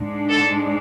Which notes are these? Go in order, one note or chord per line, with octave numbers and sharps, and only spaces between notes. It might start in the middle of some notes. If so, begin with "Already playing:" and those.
Already playing: G#2 G#3 D4
A4